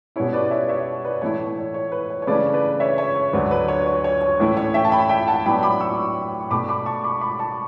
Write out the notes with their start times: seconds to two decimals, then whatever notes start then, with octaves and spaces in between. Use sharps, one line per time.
0.16 B2 G3 C#4 E4 C#5
0.33 B4 D5
0.45 D5
0.51 C#5 E5
0.69 C#5 E5
1.05 B4 D5
1.22 A2 E3 A3 E4 C#5
1.57 C#5
1.74 C#5
1.92 B4
2.10 C#5
2.22 C#5
2.27 C#3 E3 A3 D4 B4 D5
2.54 B4 D5
2.80 C#5 E5
2.98 C#5 E5
3.15 C#5
3.33 D2 D3 F#3 B4
3.51 B4
3.68 C#5
3.87 C#5
4.04 C#5
4.22 C#5
4.39 A2 E3 A3 C#4 E4
4.57 C#5
4.74 E5 G5
4.84 A5
4.92 G5 B5
5.09 E5 G5
5.28 F#5 A5
5.46 A2 F#3 B3 D4 G5 B5
5.63 B5 D6
5.81 C#6 E6
6.40 C#6
6.51 B2 A3 D4 B5 D6
6.69 B5 D6
6.86 A5 C#6
7.04 B5 D6
7.21 B5 D6
7.39 A5 C#6